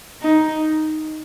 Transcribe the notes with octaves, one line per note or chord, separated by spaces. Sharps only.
D#4